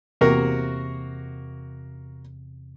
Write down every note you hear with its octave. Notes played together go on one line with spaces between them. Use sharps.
E2 C3 A#3 F#4 A#4